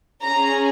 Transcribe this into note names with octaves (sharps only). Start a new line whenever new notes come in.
C#4 G#4 A#5